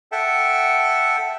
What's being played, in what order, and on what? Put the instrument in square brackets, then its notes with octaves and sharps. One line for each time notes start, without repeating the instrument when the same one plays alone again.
[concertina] A4 E5 F#5 G5 A5